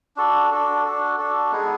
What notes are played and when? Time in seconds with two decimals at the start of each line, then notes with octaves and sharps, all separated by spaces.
0.16 D4 F#4 A4
0.51 D4 F#4 A4
0.85 D4 F#4 A4
1.18 D4 F#4 A4
1.51 G#3 B3 D#4 G#4